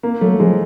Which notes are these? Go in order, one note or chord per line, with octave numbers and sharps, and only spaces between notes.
A#3
F#3 A3
F3 G#3